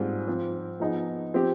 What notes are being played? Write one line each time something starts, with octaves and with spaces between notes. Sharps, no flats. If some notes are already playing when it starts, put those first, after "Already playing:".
Already playing: G#2 G3 C4 F4 G#4
F3 C4 F4
F3 B3 D#4 G#4
F3 C4 G4